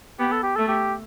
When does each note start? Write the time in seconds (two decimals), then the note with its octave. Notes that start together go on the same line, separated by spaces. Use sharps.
0.19 B3 G4
0.32 A4
0.43 G4
0.56 A3 A4
0.68 G4